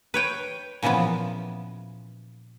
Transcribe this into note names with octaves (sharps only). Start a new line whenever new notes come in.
B4 C#5 G5
A#2 C#3 E3 F3 B3